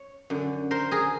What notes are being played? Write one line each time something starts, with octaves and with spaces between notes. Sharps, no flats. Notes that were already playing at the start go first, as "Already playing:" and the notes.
Already playing: C#5
F#2 D3
A#4 C5
G#4 A#4